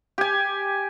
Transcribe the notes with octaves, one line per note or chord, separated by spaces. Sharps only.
G4 G#5